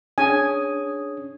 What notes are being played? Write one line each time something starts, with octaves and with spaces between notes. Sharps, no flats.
C#4 D4 G#4 C#5 G#5 D#6